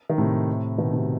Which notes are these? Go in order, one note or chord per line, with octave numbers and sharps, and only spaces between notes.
D#3
A2 C3
B2 D#3
A2 C3